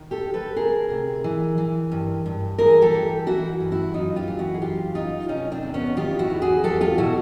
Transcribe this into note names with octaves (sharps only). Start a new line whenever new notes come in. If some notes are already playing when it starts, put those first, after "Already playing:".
Already playing: D#3
G4 A4
D2
A4 B4
D2 G#4 A#4
C3
E3
E3
G2
G2
E3 G#4 A#4
G4 A4
E3
E3 E4 F#4
G2
E4 F#4
F#2 D#4 F4
F4 G4
E3
E4 F#4
G#4
F#2 F4 G4
F#2 D#4 F4
C3 C#4 D#4
C4 D4
E2
B3 C#4
D#3 F4 G4
E4 F#4
E2
F#4 G#4
E2 G4 A4
F4 G4
B2 E4 F#4